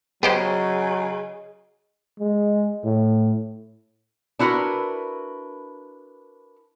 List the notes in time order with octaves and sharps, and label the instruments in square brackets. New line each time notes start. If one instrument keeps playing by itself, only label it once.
[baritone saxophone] C#3 [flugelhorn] F#3 [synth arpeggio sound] B3 G4 C5 [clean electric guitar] G#4 D#5
[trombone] G#3
A2
[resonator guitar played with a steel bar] D4 E4 F#4 A#4 B4